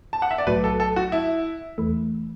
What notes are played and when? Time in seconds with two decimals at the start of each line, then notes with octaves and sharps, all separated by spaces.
0.13 A5
0.22 F#5
0.31 E5
0.38 D5
0.47 B1 A2 F#3 A3 F#4 B4
0.64 A4
0.80 A4
0.96 F#4
1.12 E4
1.78 E2 E3 A3